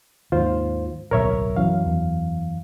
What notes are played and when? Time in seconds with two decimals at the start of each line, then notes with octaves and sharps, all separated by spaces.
0.32 D#2 G#2 F4 C5
1.11 D1 B1 B2 A#4 C#5 E5
1.56 F#2 E3 F5
1.86 E2